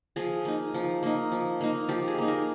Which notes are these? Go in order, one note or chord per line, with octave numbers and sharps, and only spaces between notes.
F3 G#4
A#3 D#4
F3
A#3 D#4
F3
A#3 D#4
F3 G4
G#4
A#3 D#4
A#4